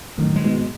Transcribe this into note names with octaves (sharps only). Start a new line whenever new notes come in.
F#2 A2 D#3
A2 G#3
G#2 B2